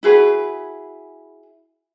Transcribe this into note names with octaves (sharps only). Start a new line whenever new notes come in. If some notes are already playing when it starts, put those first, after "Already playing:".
E4 F#4 G#4 B4